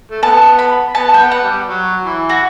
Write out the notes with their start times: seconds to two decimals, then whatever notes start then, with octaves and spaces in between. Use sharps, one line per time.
0.11 A3
0.22 B3 A5
0.59 B5
0.95 B3 A5
1.14 G5
1.20 B3
1.32 F#5
1.44 G3
1.68 F#3
2.05 E3
2.29 F#4